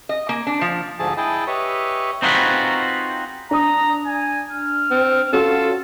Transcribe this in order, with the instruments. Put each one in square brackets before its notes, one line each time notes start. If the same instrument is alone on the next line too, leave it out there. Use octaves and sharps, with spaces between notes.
[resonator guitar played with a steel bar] D#5
A#3
D4
F3
[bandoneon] D2 G#2 F3 A3 G#4 A5
E4 G#4 D#5 G5 A5
G4 B4 C#5 D#5 E5 C#6
[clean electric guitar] C4 D#4 F4 F#4 G#4 B4
[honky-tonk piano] D4 D#6 [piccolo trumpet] A#5
[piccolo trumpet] G#5
F6
[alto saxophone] C4
[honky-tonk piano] C#4 F#4 [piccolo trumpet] F4 [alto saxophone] A4